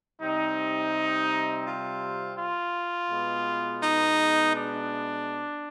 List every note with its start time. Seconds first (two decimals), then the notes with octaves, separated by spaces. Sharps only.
0.21 C3 G3 C4 D#4
1.66 F4
2.38 F4
3.10 B2 G#3 B3
3.82 D#4
4.54 D4